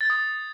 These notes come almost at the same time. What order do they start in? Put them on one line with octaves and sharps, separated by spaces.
A6 G#6 D#6